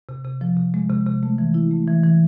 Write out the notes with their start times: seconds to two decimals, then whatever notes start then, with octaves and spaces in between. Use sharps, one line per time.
0.09 C3
0.24 C3
0.41 F3
0.57 C3
0.74 G#3
0.90 C3
1.06 C3
1.23 A3
1.38 E3
1.54 E4
1.71 A3
1.88 E3
2.03 E3